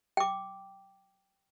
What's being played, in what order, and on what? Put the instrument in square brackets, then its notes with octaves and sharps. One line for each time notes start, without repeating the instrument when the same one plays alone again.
[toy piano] G5 D6